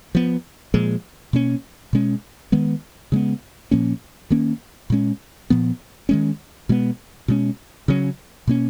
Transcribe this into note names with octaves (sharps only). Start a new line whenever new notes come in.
F3 B3
A#2 F3 G#3
B2 A#3 C#4
B2 G#3 C#4
D#3 G#3 B3
C#3 G#3 B3
A#2 F3 A#3 C#4
D#3 A#3 C#4
A#2 G#3 C#4
A#2 F3 B3
D#3 G#3 C#4
B2 G#3 B3
B2 G#3 C#4
C#3 F#3 C#4
B2 A#3 C#4